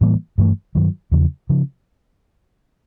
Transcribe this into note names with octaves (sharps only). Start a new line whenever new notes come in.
A2 E3 G3 A#3
G2 E3 A3
G2 D#3 F#3
E2 C#3 F3
C#3 F3